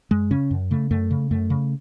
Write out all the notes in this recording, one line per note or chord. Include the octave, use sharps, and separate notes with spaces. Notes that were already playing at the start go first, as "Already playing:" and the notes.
F#2 G#3
C#3 C#4
F#2
C#3 A3
F#2 A3
C#3
F#2 A3
C#3